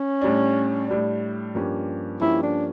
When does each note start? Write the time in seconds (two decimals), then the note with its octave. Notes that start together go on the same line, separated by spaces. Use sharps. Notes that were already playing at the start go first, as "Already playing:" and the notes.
Already playing: C#4
0.21 A2 G3 D4
0.88 A2 G3 D4
1.55 G2 F3 A#3 C#4 G4
2.21 G2 F3 A#3 C#4 E4 G4
2.43 D4